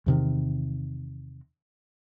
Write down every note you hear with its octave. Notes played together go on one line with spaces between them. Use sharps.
E2 C3 D#3